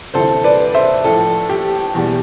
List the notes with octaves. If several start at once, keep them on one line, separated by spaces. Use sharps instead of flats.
D2 C3 E3 G3 A4 C5
B4 D5
C5 E5
A2 F3 A4
G4
E2 B2 G3